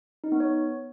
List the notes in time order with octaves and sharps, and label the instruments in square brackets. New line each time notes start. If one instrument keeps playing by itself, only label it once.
[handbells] D#4
B3
C#5